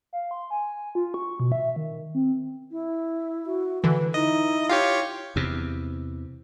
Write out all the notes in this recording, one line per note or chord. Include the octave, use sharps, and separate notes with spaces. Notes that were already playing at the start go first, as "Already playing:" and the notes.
F5
C6
G#5
F4
C#6
B2
E5
D#3
C4
E4
F#4
D3 E3 B4
D#4 E4 D#5
F4 G4 C#5 F5
E2 C3